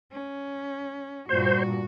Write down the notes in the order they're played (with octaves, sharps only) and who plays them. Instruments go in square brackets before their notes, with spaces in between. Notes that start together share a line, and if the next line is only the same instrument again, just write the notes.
[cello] C#4
[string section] G2 A#2 [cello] F#4 [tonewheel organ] C5